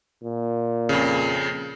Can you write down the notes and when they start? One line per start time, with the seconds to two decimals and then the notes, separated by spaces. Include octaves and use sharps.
0.23 A#2
0.89 F2 C#3